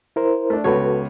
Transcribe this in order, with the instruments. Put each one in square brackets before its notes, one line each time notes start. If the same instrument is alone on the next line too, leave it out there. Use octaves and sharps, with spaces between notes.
[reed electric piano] E4 A#4 C5
[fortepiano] A3 D4
[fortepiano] C#2 B3 C#5 [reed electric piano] F#4 A4 B4